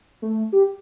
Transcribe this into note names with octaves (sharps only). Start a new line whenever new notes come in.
A3
G4